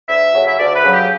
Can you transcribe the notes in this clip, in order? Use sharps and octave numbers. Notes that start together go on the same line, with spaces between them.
D2 E5
C#3 F#3
E5
D2 D5
B4
C#3 F#3
G4